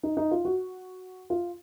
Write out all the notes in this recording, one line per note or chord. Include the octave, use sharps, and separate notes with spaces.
D#4
D#4
F4
F#4
F4